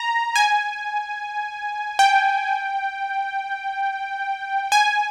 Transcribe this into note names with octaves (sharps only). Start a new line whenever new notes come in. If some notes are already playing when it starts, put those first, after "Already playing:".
Already playing: A#5
G#5
G5
G#5